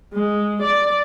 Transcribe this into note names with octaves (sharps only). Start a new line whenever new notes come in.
G#3
D5